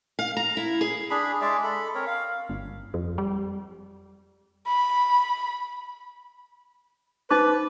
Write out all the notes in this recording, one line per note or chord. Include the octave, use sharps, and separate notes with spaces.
F5
A#5
E4
G#4
D4 G#4 B5
G#3 G#4 D5 E5
A4 B5
C4 A#4 C#5
F5
G1
F2
G3
B5
D#4 B4 C5 D6